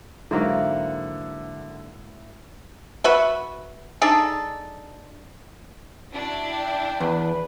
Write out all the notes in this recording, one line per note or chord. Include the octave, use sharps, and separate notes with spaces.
G#2 D3 F#3 A#3 E4 F5 F#5
F#4 B4 E5
D4 D#4 G#4 A4
D4 E4 F#4
G5
E2 B4